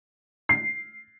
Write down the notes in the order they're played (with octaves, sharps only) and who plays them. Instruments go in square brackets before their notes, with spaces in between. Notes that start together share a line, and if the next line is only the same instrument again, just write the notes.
[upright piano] C7